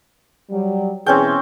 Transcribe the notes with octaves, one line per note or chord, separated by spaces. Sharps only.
F#3 G3
B2 E3 C4 C#4 G#4 G5